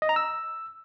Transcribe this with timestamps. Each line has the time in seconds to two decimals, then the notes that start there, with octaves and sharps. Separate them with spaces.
0.02 D#5
0.09 A#5
0.16 E6